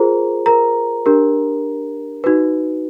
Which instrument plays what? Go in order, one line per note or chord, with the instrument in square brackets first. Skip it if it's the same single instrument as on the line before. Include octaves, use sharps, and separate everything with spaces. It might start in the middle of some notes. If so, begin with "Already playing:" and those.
Already playing: [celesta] F4 G#4 A#4 C5 A#5
A#4 A#5
D4 G4 A#4
D#4 F#4 B4